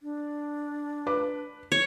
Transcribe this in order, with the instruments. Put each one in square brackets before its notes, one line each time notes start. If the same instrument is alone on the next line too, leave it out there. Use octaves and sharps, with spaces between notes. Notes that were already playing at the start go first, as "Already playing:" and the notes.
[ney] D4
[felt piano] B4 D6
[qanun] C#5